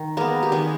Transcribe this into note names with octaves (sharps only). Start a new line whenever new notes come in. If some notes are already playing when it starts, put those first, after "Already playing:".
Already playing: D#3
G#3 A#3 B3 A#4
G4
D#3 G#3 G#4